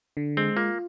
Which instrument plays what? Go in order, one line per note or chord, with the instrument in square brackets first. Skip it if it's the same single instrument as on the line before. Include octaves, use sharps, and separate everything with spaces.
[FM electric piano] D3
[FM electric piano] G#3 [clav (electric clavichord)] C4
[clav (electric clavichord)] A#3 [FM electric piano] F4